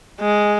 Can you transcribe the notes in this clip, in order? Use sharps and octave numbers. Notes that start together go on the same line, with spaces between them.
G#3